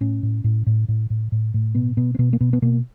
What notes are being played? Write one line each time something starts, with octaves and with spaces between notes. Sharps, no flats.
A2 C#4
A2
A2
A2
A2
A2
A2
A2
B2 B3
B2 B3
C4
B2 B3
A#3
B2 B3
B3
B2 A#3